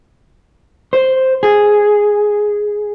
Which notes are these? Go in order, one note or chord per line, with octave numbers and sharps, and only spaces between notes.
C5
G#4